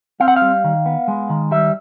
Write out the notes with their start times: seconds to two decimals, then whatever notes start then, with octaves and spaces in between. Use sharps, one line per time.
0.20 C4 F5
0.28 F#5
0.36 F5
0.42 G3
0.64 D#3
0.86 B3
1.08 G#3
1.30 D#3
1.51 G3 E5